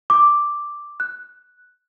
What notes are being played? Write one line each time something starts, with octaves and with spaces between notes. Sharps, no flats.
D6
F#6